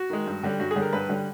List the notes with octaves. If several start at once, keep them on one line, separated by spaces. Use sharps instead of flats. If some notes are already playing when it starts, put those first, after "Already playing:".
Already playing: F#4
D#3 G#3
G2
D3 G3
G2 F#4
G#4
D3 G3
A#4
G2 B4
D3 G3